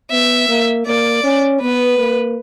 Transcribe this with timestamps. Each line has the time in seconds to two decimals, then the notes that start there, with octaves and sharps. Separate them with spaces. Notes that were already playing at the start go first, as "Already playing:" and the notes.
0.11 B3 E5
0.48 A#3
0.87 A#3 D5
1.24 C#4
1.61 B3 B4
1.98 A#3